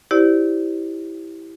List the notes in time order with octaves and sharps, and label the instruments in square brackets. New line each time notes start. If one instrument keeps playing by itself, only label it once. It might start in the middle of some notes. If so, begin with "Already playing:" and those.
[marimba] E4 G4 C5 D5